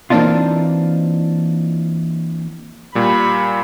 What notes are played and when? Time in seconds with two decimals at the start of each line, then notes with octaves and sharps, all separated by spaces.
0.10 E3 A#3 C4 D4 D#4 F4
2.95 A#2 G3 B5